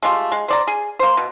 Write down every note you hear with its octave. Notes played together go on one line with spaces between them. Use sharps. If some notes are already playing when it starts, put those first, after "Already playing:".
G#3 A3 F4 G4
G#3
C5 D5 A#5
G#4
A#3 C5
B2